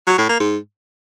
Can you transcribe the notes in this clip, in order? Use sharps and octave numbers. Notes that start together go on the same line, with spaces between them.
F#3
A2
A#3
G#2